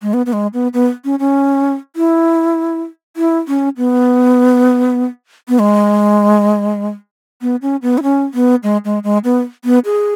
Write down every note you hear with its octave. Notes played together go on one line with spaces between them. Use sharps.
G#3
B3
B3
G#3
B3
B3
C#4
C#4
E4
E4
C#4
B3
B3
G#3
B3
C#4
B3
E4
C#4
B3
G#3
G#3
G#3
B3
B3
G#4